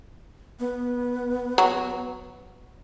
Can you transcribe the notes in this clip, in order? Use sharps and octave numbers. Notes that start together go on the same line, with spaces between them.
B3
F#3